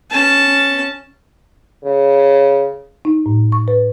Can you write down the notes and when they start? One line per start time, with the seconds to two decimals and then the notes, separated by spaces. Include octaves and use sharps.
0.11 C#4 A5
1.85 C#3
3.05 D#4
3.26 A2
3.52 C#6
3.68 B4